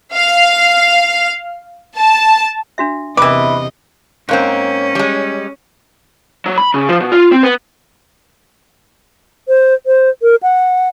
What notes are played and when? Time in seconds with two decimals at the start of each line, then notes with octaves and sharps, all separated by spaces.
0.15 F5
1.96 A5
2.78 D4 F#4 E5
3.17 E2 C3 E3 A#4 B4 D#5 D6
4.29 G#2 A#3 C4 C#4
4.95 G3 G#3
6.46 F#3
6.58 B5
6.74 C#3
6.89 F3
7.01 B2
7.12 F4
7.32 C4
7.44 B3
9.48 C5
9.86 C5
10.22 A#4
10.43 F#5